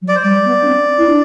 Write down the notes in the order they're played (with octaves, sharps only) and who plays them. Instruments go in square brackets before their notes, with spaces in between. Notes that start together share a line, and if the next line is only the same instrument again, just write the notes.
[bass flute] F#3
[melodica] D5
C5
[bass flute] G3 [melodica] D5
[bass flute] B3
D4
C4
E4
D4